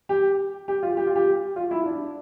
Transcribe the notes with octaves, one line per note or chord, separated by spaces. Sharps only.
G4
G4
F4
G4
F4
G4
F4
E4
D4